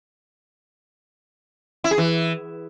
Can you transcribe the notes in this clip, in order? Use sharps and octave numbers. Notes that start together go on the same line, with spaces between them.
E4
G#4
E3